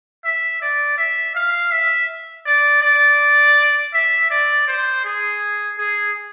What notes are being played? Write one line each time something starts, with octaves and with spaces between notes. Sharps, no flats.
E5
D5
E5
F5
E5
D5
D5
E5
D5
C5
G#4
G#4